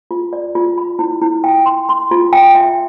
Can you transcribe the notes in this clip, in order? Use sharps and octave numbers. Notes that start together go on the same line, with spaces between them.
F4
D5
F4
B5
E4
E4
G5
C6
C6
F4
G5
E5